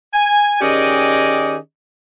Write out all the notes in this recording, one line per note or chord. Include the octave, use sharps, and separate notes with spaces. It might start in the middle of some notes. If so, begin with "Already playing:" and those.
G#5
D#3 C#4 G4 G#4 D5 D#5